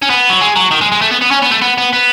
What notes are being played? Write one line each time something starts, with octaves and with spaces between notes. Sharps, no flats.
C#4
B3
F#3
G#3
F#3
D#3
G#3
G#3
A3
B3
B3
C#4
B3
A3
B3
B3
B3